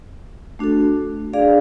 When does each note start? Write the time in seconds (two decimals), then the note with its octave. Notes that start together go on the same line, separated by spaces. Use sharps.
0.59 A3 D4 F#4 A4
1.33 D4 G#4 D5 F5